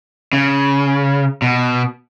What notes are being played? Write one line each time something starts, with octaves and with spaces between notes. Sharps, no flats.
C#3
B2